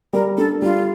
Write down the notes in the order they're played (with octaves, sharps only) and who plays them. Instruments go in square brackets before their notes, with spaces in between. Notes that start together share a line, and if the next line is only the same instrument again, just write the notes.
[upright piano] G3 [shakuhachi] A#4
[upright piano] D4 [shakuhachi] A4
[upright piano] G3 [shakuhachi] F4